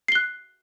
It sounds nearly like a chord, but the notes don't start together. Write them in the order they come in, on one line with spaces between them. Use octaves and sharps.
C7 G7 F#6